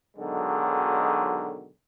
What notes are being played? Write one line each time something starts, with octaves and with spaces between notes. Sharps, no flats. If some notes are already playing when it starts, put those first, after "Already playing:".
B1 D3 D#3 F#3 G#3